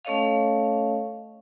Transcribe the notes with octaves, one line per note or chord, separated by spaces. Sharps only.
A3 C#4 A4 C#5 D#5 F5